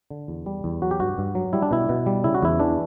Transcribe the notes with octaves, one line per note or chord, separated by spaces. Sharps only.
D3
E2
G3
E2
F#3 F#4
G4
G2 F#4
G2
F#3
G3 E4
D4
B2 E4
B2
G3
C#3 E4
F#4
E2 E4
E3 D4